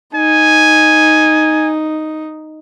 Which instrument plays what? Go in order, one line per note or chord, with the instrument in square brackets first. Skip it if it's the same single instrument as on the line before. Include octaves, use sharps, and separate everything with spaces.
[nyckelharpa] D#4 [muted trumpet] G#5